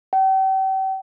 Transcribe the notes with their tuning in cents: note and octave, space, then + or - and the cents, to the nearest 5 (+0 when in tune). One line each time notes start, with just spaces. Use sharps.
G5 -40